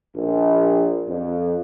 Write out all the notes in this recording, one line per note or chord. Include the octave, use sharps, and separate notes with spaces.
A#1
F2